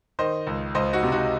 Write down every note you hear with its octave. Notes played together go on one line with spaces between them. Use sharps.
D#3 C5 D#5
C#2
C#2 C5 D#5
D#4 F#4
C3
D#4 F#4